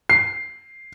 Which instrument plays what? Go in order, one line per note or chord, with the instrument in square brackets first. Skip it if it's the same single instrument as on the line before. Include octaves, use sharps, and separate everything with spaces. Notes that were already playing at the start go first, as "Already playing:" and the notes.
[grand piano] C7